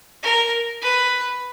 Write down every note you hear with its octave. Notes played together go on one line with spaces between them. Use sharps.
A#4
B4